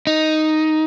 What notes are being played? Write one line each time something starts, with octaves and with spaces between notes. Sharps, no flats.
D#4